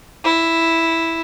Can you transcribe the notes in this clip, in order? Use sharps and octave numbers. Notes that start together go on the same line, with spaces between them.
E4